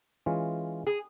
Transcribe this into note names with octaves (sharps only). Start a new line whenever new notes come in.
E3 G#3 C#4 F4
G#4